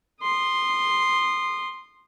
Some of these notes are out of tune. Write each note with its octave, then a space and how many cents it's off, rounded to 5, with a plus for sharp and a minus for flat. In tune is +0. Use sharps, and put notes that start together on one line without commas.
C6 +0 D#6 -25